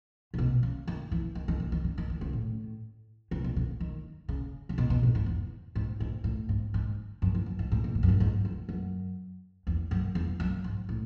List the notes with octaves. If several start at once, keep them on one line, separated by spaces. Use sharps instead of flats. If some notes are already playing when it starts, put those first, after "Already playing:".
A2
B2
C#3
D#3
E3
D#3
D#3
C#3
D#3
C#3
D#3
D#3
C#3
A2
C#3
B2
C#3
D#3
C#3
C#3
B2
B2
A2
G#2
E2
G#2
G#2
A2
G#2
G#2
F#2
E2
F#2
G#2
A2
B2
A2
F#2
G#2
G#2
F#2
F#2
E2
F#2
E2
F#2
G#2
A2